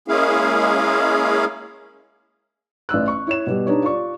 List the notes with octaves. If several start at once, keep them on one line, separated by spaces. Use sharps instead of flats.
G#3 A#3 C#4 E4 G#4 F5
A1 D5 E6 F#6
C#6
E4 C#5 E7
B2 G3
D4 D#4 G4 B4 C#5
F4 D5 C#6